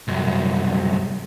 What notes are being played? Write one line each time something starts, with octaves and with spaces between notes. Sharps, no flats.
C2 F#2